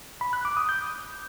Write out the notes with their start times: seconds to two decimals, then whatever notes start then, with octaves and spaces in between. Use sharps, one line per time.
0.21 B5
0.33 F#6
0.45 D6
0.57 D#6
0.69 G6